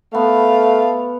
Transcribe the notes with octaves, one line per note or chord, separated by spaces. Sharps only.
A3 B3 F5